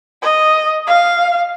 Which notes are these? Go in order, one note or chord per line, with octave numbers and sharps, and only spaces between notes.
D#5
F5